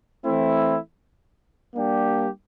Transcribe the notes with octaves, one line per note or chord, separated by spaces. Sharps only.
E3 A3 C4 E4
G3 A#3 D4 G4